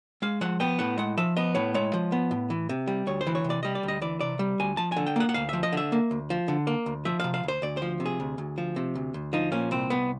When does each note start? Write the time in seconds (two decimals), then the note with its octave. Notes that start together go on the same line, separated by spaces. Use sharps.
0.22 G#3 F5
0.41 F3 F#5
0.60 B3 G5
0.79 A2 F#5
0.98 G#3 F#5
1.17 F3 E5
1.36 B3 D#5
1.55 A2 C#5
1.74 G#3 C#5
1.93 F3
2.12 B3
2.31 A2
2.50 E3
2.69 C3
2.87 G3
3.07 D2 C#5
3.21 C5
3.27 E3
3.35 C#5
3.44 C3
3.50 D5
3.63 G3 D#5
3.75 D5
3.83 D2
3.88 D#5
4.02 E3 D5
4.20 C3 D5
4.39 G3
4.59 D2 G#5
4.77 F3 A5
4.92 D3 G#5
5.07 G5
5.16 A#3 F#5
5.29 F#5
5.34 D2 F5
5.49 F3 E5
5.63 D#5
5.73 D3 E5
5.92 A#3
6.11 D2
6.30 F3
6.48 D3
6.67 A#3
6.86 D2
7.05 F3 E5
7.20 C3 F5
7.34 F5
7.43 D2 C5
7.62 D2 D5
7.77 F3 C5
8.00 C3
8.06 G#4
8.20 D2
8.38 D2
8.58 F3
8.76 C3
8.95 D2
9.14 D2
9.33 F3 D#4
9.52 A#2 C#4
9.71 C2 C4
9.90 C2 B3